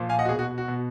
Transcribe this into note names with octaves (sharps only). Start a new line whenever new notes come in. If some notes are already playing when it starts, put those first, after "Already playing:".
Already playing: A#2 F3
F5 G#5
D#5 F#5
F#4
B2 G#4
F#4
F#4
B2